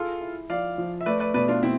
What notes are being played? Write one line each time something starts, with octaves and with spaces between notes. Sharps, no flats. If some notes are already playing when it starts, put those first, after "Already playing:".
Already playing: F4 G#4 A4
E4
F3 D5 F5
F3
E5
A3 B4 D5
B4 D5
B2 B4 D5
D4 F4
B2 C4 E4